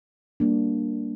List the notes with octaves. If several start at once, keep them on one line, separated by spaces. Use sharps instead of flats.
G3 A#3 D4